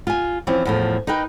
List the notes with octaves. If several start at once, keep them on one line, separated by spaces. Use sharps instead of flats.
F4 G#5
E3 F3 C4 C#4
E2 A2 F3
D#4 A#4 B4 G5